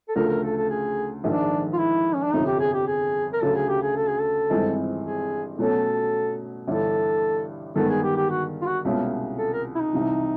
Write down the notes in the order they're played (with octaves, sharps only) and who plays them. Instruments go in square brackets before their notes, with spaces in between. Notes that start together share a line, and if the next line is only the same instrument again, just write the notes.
[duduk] A4
[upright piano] D2 C#3 F3 A3 [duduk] A#4
[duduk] A#4
A4
A4
G#4
[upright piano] A#1 G#2 D#3 G#3 [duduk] D4
[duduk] F4
E4
C#4
D4
[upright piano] G1 F2 C3 F3 [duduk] D#4
[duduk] G4
G#4
G4
G#4
A#4
[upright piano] D2 C#3 F#3 [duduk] A4
[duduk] G#4
G4
G#4
A4
G#4
A4
[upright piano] G#1 G2 E3 G#3 C4
[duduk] G#4
[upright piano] B2 F#3 A3 C#4 [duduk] A4
[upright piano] G1 G2 E3 [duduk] A4
[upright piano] G2 D#3 G#3 B3 [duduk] A4
[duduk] G#4
G4
G4
F#4
F4
F#4
[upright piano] C2 B2 G#3 C#4 F4
[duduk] A4
A#4
E4
D#4
[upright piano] C2 C3 E3